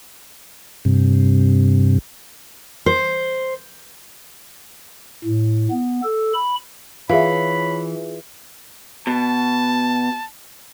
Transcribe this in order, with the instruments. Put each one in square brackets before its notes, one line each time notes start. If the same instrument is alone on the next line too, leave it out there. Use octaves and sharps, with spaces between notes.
[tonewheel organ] G2 C3
[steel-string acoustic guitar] C5
[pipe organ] A2
B3
A4
B5
[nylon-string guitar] E3 [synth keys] F4 G#4 [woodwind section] C#5 B5 [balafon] E5 F5
[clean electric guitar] B2 [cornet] A5